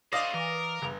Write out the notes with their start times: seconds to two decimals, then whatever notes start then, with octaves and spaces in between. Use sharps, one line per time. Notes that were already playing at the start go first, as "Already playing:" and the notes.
0.13 A3 C5 D5 D#5 F5 D#6 A#6
0.34 E3 A#4
0.82 G1 C#3